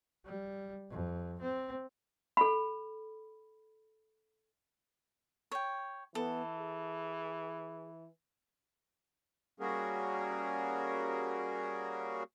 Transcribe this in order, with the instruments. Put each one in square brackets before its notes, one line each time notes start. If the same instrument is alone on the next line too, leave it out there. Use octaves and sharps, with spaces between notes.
[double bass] G3
F2
C4
[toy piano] A4 B5
[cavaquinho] C#5 G5
[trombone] E3 [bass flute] B3 [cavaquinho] A4
[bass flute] G#4
[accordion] G3 A#3 C#4 F#4 G#4 A#4